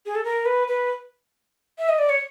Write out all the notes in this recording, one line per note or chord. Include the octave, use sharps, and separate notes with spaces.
G#4
A4
A#4
B4
B4
E5
D#5
D5
C#5